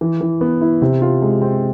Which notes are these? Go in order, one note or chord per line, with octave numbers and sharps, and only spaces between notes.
E3
E3
B3
E4
C3
F4
G#3
C4